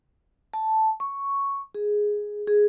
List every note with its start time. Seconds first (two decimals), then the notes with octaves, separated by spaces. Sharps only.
0.54 A5
1.00 C#6
1.75 G#4
2.48 G#4